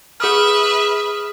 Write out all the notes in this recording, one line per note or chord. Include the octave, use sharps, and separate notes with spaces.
G#4 B4 E5 D#6 F6